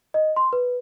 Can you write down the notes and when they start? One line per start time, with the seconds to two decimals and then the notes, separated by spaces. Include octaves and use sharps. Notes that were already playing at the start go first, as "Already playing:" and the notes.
0.14 D#5
0.36 C6
0.53 B4